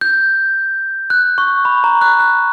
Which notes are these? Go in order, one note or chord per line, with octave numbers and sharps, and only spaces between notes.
G6
F#6
C#6
B5
A#5
F#6
F#6